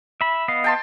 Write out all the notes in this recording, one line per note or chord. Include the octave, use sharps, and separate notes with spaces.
E5 B5
B3 D#5 F5
G5 A5 C6